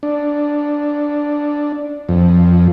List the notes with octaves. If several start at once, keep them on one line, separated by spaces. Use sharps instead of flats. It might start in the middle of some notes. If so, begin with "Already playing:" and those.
D4
F2